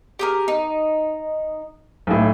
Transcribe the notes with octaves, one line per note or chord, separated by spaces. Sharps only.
G4 G#4 A#4
D#4
B1 A2